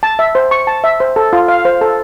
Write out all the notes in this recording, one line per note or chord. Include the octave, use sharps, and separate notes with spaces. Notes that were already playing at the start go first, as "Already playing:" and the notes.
A5
E5
C5
C#6
A5
E5
C5
A4
F4
F5
C5
A4